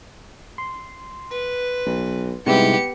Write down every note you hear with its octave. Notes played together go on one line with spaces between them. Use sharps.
C6
B4
B1
G#2 C3 G3 B3 E4 G4 C#7